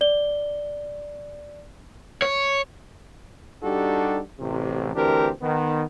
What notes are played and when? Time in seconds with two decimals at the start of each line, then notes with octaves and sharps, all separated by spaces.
0.01 D5 G7
2.22 C#5
3.64 G3 D4 D#4 F#4 G4 A4
4.40 A1 C3
4.95 D2 E3 C4 D4 G4 A#4
5.42 D#3 B3